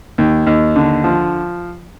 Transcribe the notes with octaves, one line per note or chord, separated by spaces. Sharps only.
D#2
D#2
D3
F3